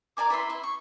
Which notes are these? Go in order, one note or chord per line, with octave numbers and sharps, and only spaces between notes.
A#4 D5 G#5 D6
E4 B4 E5 C6
E4 B5 C6
C#6